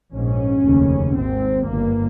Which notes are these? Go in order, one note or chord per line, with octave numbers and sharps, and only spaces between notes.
A#1 G#2 C#4
F1 D#2 C#3
G#1 G#2 C4
G1 G2 A#3